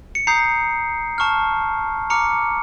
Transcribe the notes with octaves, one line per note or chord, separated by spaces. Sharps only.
C#7
A#5 D#6 G6 C7
A5 C#6 F6
A#5 D6 F6 C#7